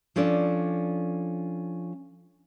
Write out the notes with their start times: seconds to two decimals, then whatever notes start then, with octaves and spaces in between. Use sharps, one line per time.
0.16 F3 C#4 D4 A4 D5